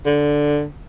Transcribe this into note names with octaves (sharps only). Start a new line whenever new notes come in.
D3